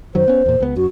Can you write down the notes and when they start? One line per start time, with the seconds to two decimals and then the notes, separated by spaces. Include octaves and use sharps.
0.15 F#2 D#3 F#3 C5
0.28 B3 C#4
0.46 E2 A#2
0.60 C#2 B3
0.76 F#2 F#4